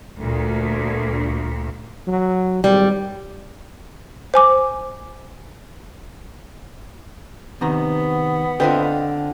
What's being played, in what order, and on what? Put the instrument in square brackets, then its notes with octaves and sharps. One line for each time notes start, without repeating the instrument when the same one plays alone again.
[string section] D2 A#2
[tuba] F#3
[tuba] G#1 [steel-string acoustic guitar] G3
[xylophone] C5 G#5 D6
[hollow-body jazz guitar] C3 D#3 A#5 [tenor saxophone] B3
[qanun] D3 C4 F4 [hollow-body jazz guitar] B4 D#5 G5